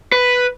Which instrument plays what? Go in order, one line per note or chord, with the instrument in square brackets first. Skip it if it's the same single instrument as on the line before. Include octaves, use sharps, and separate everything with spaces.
[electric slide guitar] B4